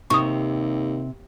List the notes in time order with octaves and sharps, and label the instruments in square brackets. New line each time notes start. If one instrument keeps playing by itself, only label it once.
[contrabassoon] D#2 [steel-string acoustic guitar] C3 [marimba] C#6 D#6